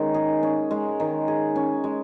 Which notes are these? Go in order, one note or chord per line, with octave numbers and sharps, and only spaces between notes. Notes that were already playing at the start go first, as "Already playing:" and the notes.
Already playing: D#3 G#3 C#4
G#4
C#4
G#3
D#3
G#4
C#4
G#3